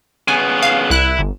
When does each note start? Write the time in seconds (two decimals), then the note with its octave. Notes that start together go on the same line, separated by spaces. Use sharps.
0.28 C#3 B3 G#5
0.62 F5
0.90 C2 E4 F#6
1.19 G1